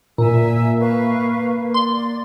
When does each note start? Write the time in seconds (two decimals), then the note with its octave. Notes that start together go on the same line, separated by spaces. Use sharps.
0.18 A#2 A#3 E5 G#5 E6
0.80 B4 F5 C#6
1.74 D5 C6